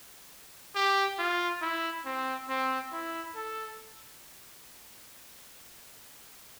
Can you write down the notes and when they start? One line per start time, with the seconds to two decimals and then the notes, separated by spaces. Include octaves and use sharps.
0.75 G4
1.19 F4
1.62 E4
2.05 C4
2.49 C4
2.92 E4
3.35 A4